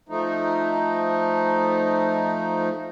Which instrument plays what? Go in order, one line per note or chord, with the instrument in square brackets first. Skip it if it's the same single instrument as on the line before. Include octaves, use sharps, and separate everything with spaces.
[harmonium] F3 A3 D#4